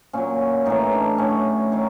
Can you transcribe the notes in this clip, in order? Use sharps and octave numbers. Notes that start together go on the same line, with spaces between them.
A#2 F#3 C#4
A2 E3 D#4
D4
A2 F#3 C#4
D#3 F#3